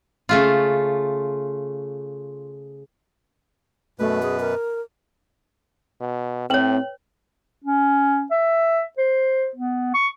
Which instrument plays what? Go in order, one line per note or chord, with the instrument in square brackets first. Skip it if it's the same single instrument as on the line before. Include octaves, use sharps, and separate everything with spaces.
[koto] C#3 A3 F4
[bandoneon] F#2 B2 B4 [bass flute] A3
[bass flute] G#4
A#4
[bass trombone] B2
[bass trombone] A2 [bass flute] C4 [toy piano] B4 C#5 [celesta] G5 F#7
[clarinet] C#4
E5
C5
B3
C#6